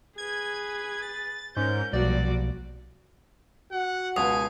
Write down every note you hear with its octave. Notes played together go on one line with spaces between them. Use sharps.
G#4 B4 G#6
A6
G#2 C#4 A#4 G6
B1 A#2 F3 G3 F#4 D5
F#4 F#5
C#2 B2 G#5 D#6